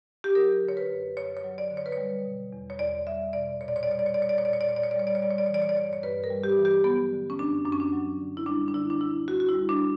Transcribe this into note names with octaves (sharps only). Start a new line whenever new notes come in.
G4
F#3 A#4
D3
C#5
B4
F#2
F#2 C#5
C#5
F#3
D5
D3
C#5
B4
C#5
G3
B2
E2
C#5
E2 D5
G3 E5
B2 D5
A#2 C#5
D5
C#5
D5
G3 C#5
D5
C#5
G3 D5
C#5
D5
C#5
A#2 D5
C#5
D5
A#2 C#5
D5
C#5
D5
G3 C#5
D5
C#5
G3 D5
C#5
D5
E3 C#5
D5
C#5
D5
G2 C#5
D5
C#5
G2 B4
A#4
G3
G4
E3
G4
F#3 B3
D3
C#4
F#2 D4
F#2 D4
C#4
D4
F#3
D3
E4
G3 D4
D4
D3 E4
D4
D2 E4
D2 F#4
F#4
E4
G3
D4